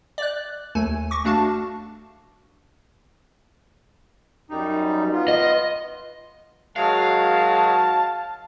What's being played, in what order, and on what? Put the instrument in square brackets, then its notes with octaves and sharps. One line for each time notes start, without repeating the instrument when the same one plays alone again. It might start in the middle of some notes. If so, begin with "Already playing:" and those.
[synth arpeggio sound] D5 F#6
D#2 A3 G#5
C#6 D6 A#6
A3 D4 F#4 F5 A5
[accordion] F#2 G3 D#4
B3 F4
[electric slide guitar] D#5
[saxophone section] D#3 F#3 G#3 [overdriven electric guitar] F5 [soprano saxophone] A5